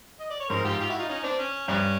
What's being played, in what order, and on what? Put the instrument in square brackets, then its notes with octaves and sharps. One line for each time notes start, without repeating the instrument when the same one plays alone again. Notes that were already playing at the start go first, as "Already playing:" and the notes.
[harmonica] D#5
D5
C#5
[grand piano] G#2 [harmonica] A#4 C5
[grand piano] G#2 [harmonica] F4 G4
[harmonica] F4 G4
E4 F#4
D#4 F4
C#4 D#4
D#4
C4 D4
C#4
[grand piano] G2 [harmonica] F3 A#3 C#4